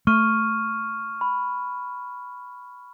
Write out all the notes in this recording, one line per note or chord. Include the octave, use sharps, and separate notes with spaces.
A3 C#6 F6 D#7
B5